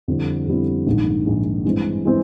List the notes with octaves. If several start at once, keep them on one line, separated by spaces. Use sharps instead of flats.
F2 D3 G3 C4 E4
F2 D3 G3 C4 E4
A#1 G#2 D#3
A#1 G#2 D#3
G2 E3 G#3 C4
E3 G#3 C4